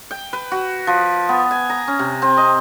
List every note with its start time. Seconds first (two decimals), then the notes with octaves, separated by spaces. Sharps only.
0.11 G5
0.33 B4
0.52 F#4
0.87 F3
1.29 B3
1.51 G#5
1.70 A#5
1.88 C#4
1.99 C3
2.22 C4
2.37 D#5